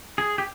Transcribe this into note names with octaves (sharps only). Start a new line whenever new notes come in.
G#4
G4